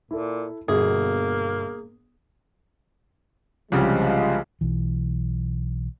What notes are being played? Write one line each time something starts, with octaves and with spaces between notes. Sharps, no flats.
A#2 E4 A4
G1 B2 A#3 F#4 G#4
C2 C#3 F3 G3 G#3
B1 E3